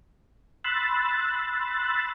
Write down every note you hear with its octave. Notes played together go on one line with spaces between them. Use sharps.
B5 C6 E6 F#6 A6